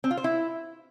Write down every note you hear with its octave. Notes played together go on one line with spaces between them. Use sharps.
C4
F4
C5
E4